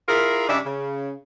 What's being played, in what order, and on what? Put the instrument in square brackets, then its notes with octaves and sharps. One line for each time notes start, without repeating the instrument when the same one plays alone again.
[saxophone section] E4 F4 G#4 A#4
G2 C#3 D4 D#4 D5 E5
C#3